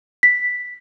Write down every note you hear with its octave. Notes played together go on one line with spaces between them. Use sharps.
B6